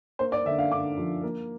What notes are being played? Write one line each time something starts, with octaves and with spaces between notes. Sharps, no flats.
A#3 C5
D5
D3 E5
F5
D3 D6
F3
A#3